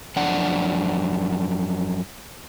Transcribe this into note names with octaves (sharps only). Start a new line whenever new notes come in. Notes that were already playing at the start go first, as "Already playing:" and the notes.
F#2 F3 D4 D5 F#5